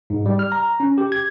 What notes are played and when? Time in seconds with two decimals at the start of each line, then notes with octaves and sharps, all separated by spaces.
0.10 G#2
0.26 G3
0.39 F6
0.52 A#5
0.80 C#4
0.98 G4
1.12 G#6